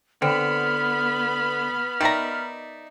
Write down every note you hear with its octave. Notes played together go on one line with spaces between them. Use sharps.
D3 B3 C4 B5 F6
D#3 D#4 D5 E5 A#5